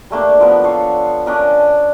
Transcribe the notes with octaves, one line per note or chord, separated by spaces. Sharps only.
G3 A3 A#3 D4
F3 B3 A#4
D4 A4 C#5 F5
C#4 D4 A#4 D#5